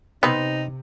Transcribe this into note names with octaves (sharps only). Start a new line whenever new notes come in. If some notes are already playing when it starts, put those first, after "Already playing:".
C3 B3 C4 D#4 B4